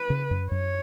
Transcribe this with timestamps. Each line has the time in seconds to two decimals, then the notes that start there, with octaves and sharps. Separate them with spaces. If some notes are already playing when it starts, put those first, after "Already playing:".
Already playing: B4
0.10 C#3
0.31 F#2
0.51 F#2 C#5